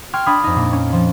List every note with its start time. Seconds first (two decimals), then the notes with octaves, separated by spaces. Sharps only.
0.13 G5 C6 C#6 F6 G#6
0.26 D4 F5 B5 D#6 G#6
0.44 F2 D#4
0.56 A#2 A#3
0.73 C#4
0.93 F3